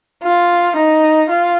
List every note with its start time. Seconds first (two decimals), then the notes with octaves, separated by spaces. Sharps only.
0.23 F4
0.77 D#4
1.29 F4